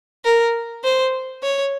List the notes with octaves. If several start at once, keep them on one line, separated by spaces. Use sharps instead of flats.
A#4
C5
C#5